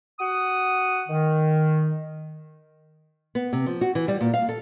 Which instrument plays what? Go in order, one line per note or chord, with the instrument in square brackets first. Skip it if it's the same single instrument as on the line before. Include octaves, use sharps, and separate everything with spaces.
[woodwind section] F#4 F#5 D#6
D#3
[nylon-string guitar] B3
C3
F3
F#4
E3
G3
A#2
F5
A4